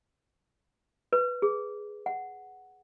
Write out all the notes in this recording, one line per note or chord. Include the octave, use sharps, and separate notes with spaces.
B4
G#4
F#5